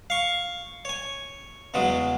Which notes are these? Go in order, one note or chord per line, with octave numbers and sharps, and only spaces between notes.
F5 C#6
C#5 G#5
E2 C#3 F#3 G#3 D#6